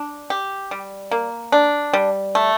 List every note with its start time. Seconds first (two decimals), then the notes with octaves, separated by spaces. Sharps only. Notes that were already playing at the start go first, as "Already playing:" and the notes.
Already playing: D4
0.30 G4
0.71 G3
1.11 A#3
1.52 D4
1.93 G3
2.35 A3